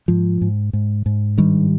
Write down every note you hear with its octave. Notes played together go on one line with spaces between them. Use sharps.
G#2 F3
G#2
G#2
G#2
G2 D#3 G3